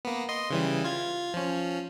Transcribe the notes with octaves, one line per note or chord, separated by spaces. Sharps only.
A#3 B3
D#5 C6
C#3 E3 G3
F4 G#6
F3 C#4